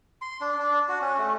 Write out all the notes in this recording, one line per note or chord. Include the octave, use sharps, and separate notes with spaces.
C6
D4
D4
F#4
C#4
A3